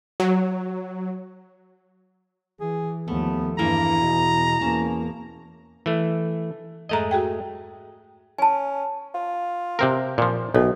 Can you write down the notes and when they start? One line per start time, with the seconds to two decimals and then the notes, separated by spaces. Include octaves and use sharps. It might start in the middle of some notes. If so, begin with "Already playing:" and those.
0.20 F#3
2.61 E3 G#4
3.08 D#2 F3 A3 B3
3.59 E2 G2 E3 A#3 A#5
4.01 B2
4.61 E2 A#3 C#4 A5
5.86 E3 A3
6.89 F2 G#2 G#3 A3 D#5 A#5
7.11 F#4 G#4 G5
8.38 C#4 G#5 A5
9.14 F4
9.79 C3 C4 A#4
10.18 A#2 F3
10.54 B1 A2 A4 C#5